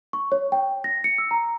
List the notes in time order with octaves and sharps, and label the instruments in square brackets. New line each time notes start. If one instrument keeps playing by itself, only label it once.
[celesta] C#6
C#5
G5
A#6
C#7
E6
A#5